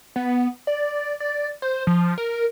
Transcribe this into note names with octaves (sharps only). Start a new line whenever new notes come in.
B3
D5
D5
C5
F3
A#4